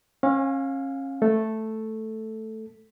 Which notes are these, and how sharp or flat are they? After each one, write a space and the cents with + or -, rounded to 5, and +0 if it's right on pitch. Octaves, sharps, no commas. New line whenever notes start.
C#4 -35 F5 +20 G#5 -5
A3 +0 A4 +0